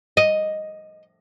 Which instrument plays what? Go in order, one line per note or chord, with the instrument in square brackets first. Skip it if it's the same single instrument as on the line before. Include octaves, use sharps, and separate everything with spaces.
[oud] D#5